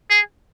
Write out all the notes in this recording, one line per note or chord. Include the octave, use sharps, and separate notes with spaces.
G#4